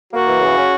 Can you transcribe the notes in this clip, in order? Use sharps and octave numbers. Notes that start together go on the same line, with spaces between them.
A#3 F#4
E3
C#3
C#4